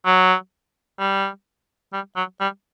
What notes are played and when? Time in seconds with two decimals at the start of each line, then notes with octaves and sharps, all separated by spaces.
0.06 F#3
0.99 G3
1.93 G3
2.16 F#3
2.41 G3